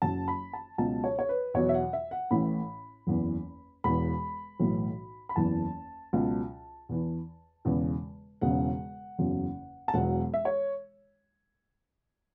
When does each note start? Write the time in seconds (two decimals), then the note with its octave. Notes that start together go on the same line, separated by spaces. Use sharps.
0.02 F#1 F#2 F#3 A5
0.28 B5
0.53 A5
0.78 C#2 B2 F#3 A5
1.04 C#5
1.19 C#5
1.29 B4
1.54 E2 B2 F#3 C#5
1.69 E5
1.74 F#5
1.93 E5
2.11 F#5
2.31 A1 A2 E3 B5
3.07 F#1 E2 E3
3.84 E1 E2 E3 B5
4.60 B1 A2 E3
5.29 B5
5.36 F#1 E2 E3 A5
6.13 C#2 B2 F#3
6.89 E2 E3
7.65 E1 E2 C#3 E3
8.41 E1 E2 C#3 F#5
9.18 F#1 E2 C#3 F#3
9.88 A5
9.94 E1 E2 B2 F#3 F#5
10.34 E5
10.45 C#5